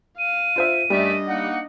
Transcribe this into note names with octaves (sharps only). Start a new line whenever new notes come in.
F5 D#7
F4 C5 E5
F#2 G3 A3 D4 D#5 E5
A#3 D#4 F#5